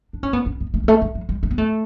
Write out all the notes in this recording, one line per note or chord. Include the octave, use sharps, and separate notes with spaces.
D4
C#4
B3
C#4
B3
A3
G3
A3
G3
F#3
G3
A3
B3
A3